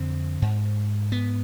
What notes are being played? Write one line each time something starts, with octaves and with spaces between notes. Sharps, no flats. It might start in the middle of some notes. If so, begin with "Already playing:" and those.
Already playing: F2 D3 C4
G#2
B3